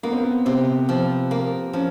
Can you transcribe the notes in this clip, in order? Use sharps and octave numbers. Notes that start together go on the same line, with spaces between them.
A#3 B3
C4
B3
C3 C4
F3
A#3
F3 C#4